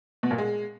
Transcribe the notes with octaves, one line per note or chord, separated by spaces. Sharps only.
B2
A#2
G#3